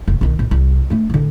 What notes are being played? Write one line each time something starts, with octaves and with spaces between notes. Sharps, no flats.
F1
B1 D#3
A#1
C2
A3 D4
A1 D3